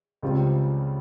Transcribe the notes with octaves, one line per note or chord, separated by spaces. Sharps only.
C#2 C#3 G3 C4 F4